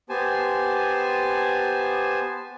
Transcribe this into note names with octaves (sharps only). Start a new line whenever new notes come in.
B3 G4 C5 G#5 A5